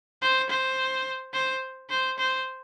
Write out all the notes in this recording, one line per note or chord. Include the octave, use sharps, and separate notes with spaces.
C5
C5
C5
C5
C5